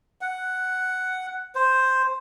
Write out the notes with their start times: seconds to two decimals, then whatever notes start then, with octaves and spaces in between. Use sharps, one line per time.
0.21 F#5
1.55 C5